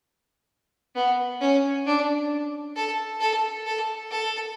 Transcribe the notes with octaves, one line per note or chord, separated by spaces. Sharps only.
B3
C#4
D4
A4
A4
A4
A4